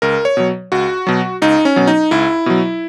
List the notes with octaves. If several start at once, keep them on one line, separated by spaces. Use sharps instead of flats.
C#2 A#4
C#5
B2 F#3
C#2 F#4
B2 F#3
C#2 D#4
C#4
B2 F#3
D#4
C#2 E4
B2 F#3